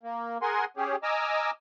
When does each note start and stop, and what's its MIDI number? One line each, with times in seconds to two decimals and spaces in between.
0.03 0.38 58
0.42 0.65 68
0.42 0.65 70
0.42 0.65 78
0.42 0.65 80
0.42 0.65 84
0.77 0.96 61
0.77 0.96 67
0.77 0.96 68
1.03 1.51 75
1.03 1.51 80
1.03 1.51 82
1.03 1.51 86
1.03 1.51 88
1.03 1.51 89